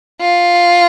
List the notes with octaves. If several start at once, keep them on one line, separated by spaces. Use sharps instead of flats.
F4